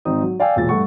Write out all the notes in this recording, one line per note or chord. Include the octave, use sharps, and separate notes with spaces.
G#1 C4 D#4 D#6
F#3
D5 F5 G5 G#5 E6
E1 A#2 A6
G2 A3 F#5 C#6